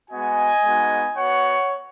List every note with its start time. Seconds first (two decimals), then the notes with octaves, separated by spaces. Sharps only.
0.11 G#3 B3 F#4 D#5 G#5
0.64 G#3 B3 D#4 F#4
1.17 B3 F#4 C#5 F#5